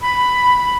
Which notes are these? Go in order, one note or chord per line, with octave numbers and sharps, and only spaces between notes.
B5